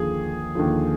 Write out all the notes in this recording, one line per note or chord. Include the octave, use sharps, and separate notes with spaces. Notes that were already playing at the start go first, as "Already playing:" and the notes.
Already playing: D#2 D3 F3 G#4
D#2 D3 F3